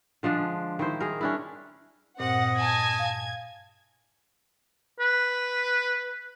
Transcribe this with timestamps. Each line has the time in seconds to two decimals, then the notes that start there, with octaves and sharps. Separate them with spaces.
0.23 D3 F3 G#3 D4
0.79 D#3 E4 C5
1.00 G#4 A#4
1.21 C#4 D4 E4
2.20 G2 A#2 C4 D#5 F#5
2.58 G#5 A5 G#6
2.99 F5
5.00 B4